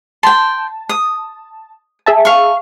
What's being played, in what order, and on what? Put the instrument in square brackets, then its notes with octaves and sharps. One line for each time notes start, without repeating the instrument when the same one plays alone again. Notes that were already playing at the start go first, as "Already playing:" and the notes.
[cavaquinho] G5 C6 [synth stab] A5
[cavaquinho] D#6
[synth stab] G#4 E5 A5
[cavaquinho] F5 C#6